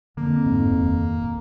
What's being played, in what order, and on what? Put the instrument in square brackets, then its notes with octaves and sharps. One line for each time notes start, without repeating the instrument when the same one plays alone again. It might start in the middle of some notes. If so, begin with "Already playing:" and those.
[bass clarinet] F2 [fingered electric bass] D3 [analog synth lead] A#3
[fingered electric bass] G#2
D#1